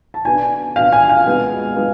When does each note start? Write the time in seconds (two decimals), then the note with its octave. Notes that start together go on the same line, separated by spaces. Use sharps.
0.14 A5
0.25 B2 B3 D4 G#5
0.76 B2 B3 D4 F5
0.92 G#5
1.09 F5
1.26 B2 G#3 B3
1.76 G#3 B3